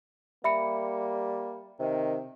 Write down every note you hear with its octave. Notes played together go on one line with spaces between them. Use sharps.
G3 A#3 E5 B5 C#7
C3 D#3